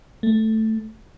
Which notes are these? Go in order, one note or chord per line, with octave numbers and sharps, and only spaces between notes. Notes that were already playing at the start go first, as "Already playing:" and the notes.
A3